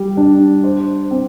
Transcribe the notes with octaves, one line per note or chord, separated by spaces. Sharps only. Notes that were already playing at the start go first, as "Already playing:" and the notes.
Already playing: G3
D4
C5
C4